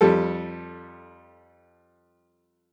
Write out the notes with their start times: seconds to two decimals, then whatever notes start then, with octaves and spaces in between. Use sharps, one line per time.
0.01 F2 G3 A4